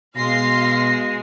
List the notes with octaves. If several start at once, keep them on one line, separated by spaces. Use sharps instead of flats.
B2 G#3 F5 C6 A#6 C7